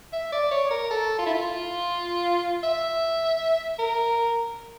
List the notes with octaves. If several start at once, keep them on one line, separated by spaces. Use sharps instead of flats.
E5
D5
C#5
A#4
A4
F4
E4
F4
E5
A#4